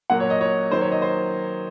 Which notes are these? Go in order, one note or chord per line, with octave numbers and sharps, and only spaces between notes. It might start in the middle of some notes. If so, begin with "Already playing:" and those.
A#2 F#3 A#3 F#5
C#5
D#5
C#5
D#3 F#3 A#3 C5
C#5
D#5
C5